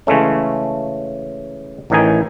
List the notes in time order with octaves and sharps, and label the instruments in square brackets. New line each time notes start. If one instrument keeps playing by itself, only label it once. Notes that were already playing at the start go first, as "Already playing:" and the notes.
[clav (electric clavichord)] C#3 E3 G#3 A3 C#4
A1 A2 D#3 E3 D#4 G#5